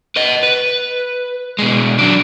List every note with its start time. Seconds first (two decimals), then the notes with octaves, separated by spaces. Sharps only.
0.16 B4 D#5
0.43 B4
1.59 B2 G#3
1.98 F#3 D4